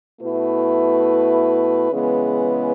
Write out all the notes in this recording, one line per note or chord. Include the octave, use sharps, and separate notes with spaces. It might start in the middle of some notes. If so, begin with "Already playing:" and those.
B2 A3 E4 B4
C#3 E3 G#3 B3